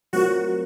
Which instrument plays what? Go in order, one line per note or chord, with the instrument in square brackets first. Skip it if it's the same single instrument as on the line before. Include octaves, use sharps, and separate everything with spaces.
[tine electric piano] F#3 A3 C4 F4 A#4 [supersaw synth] F#4